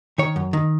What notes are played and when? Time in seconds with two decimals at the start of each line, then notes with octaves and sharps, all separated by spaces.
0.18 D#3 C#5
0.36 F#2
0.53 D#3